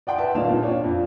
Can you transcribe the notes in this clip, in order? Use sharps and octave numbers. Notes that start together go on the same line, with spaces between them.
D5 F#5 G5 C6
B4 E5 A5
D#1 D#2 D4 D#4 F5 E7
A#2
D4 F4 C#5 D5
F2